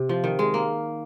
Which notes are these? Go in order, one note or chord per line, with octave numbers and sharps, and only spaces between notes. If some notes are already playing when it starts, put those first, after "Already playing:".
Already playing: C3
F3
D#3
G#3
A#3